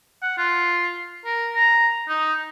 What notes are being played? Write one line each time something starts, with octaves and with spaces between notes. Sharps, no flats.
F#5
F4
A#4
A#5
D#4